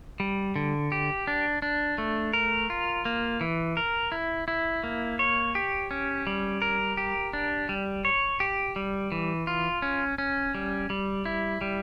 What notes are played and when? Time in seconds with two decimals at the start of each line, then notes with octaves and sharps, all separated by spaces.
0.20 G3
0.56 D3
0.92 G4
1.27 D4
1.62 D4
1.98 A3
2.33 A#4
2.70 F4
3.05 A#3
3.41 E3
3.77 A#4
4.12 E4
4.48 E4
4.84 A#3
5.19 C#5
5.55 G4
5.91 C#4
6.27 G3
6.62 A#4
6.97 G4
7.33 D4
7.69 G3
8.05 C#5
8.40 G4
8.76 G3
9.12 E3
9.47 F4
9.82 C#4
10.18 C#4
10.55 G3
10.90 G3
11.26 E4
11.61 G3